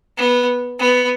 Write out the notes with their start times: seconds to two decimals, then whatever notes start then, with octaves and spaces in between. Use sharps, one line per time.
0.18 B3
0.80 B3